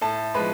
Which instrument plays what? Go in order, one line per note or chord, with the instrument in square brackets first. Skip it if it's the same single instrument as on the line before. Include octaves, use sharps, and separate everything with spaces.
[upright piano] A2 A4 A5
F3 G#3 B4 B5